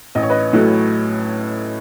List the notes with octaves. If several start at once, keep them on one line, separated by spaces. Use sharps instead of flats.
A1 D#5
C#5
B4 D#5
A2 F#3 A3